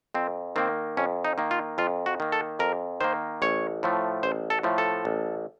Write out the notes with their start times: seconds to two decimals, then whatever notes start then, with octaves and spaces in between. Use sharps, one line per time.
0.14 F2 C4
0.56 D#3 A#3 C4
0.97 F2 C#4
1.25 D#4
1.38 D#3 A#3
1.51 F4
1.78 F2 F4
2.06 F#4
2.20 D#3 A#3
2.32 A4
2.59 F2 A#4
3.01 D#3 A#3 C5
3.42 A1 C#5
3.83 A2 F3 A3
4.23 A1 C5
4.50 A4
4.63 A2 F3 A3
4.78 A4
5.05 A1